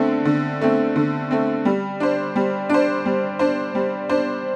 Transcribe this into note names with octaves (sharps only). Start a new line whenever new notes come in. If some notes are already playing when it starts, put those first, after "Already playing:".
Already playing: D3 A3 C4
D3
A3 C4
D3
A3 C4
G3
D4 C5
G3
D4 C5
G3
D4 C5
G3
D4 C5